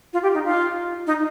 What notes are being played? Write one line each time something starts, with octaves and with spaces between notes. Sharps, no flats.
F4
G4
D#4
F4
D#4